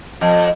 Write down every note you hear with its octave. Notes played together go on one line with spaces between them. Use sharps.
F2